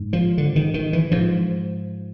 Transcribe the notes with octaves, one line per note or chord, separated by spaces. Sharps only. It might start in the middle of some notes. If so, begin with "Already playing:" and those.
Already playing: G#2
F3
D3
D#3
D#3
E3
G#2 F3